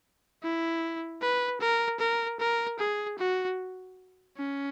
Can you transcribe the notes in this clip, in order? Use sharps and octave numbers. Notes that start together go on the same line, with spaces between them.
E4
B4
A#4
A#4
A#4
G#4
F#4
C#4